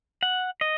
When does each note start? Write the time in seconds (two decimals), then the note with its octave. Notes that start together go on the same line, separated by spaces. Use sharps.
0.23 F#5
0.61 D#5